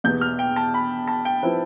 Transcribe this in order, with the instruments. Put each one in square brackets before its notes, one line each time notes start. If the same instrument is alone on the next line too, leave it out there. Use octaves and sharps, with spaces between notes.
[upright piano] E2 B2 B3 [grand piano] G6
[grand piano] F6
G5
A5
B5
A5
G5
[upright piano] F3 C4 E4 B4